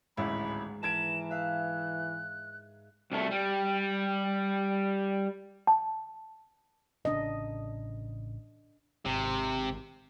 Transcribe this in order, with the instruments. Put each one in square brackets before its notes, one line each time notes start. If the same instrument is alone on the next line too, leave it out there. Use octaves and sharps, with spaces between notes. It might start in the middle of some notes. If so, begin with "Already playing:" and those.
[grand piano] D1 A1 E4 [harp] G#2 D#3 [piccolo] B5
[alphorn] E3 [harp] A#4 B4 [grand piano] A5 G#6 D7 [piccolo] E7
[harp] E5 F5 [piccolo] F#6
[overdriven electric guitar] C2 A3
G3
[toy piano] A5
[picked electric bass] A1 C#3 [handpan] D4 D#5
[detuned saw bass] G#1 [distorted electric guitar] C3